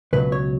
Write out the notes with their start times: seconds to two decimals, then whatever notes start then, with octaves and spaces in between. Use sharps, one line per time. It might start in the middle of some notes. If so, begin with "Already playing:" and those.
0.13 C#2 B2 F#3 B4
0.32 C#5